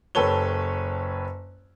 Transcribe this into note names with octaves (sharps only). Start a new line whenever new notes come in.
F#1 G4 A4 B4 C#5 G7